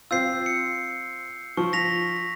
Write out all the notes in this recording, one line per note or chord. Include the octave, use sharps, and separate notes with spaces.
C4 F4 E6 G6 C7
C#7
F3 C#6
A#6 B6 F7